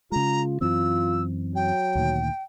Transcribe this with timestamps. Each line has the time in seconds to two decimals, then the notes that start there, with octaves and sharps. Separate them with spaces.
0.12 C#3 G#3 F4 A#5
0.61 F#2 E3 C4 F4 E6
1.55 F#3 G5
1.95 D2 A#2 D#3